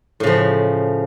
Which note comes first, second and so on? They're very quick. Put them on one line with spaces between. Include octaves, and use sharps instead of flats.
A2 C#3 F3